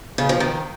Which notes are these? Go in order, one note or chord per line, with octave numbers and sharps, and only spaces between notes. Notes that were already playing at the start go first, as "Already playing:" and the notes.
C#3
F3
D#3